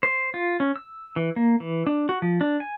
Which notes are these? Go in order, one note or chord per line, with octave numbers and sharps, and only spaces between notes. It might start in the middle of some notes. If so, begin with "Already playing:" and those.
C5
F4
C#4
E6
E3
A#3
E3
D4
F#4
F3
D4
G#5